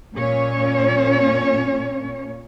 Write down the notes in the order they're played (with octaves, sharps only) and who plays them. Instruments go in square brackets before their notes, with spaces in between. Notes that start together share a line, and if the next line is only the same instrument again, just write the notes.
[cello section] A#2 C#4 C#5